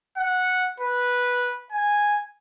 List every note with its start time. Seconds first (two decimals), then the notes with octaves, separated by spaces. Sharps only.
0.17 F#5
0.80 B4
1.72 G#5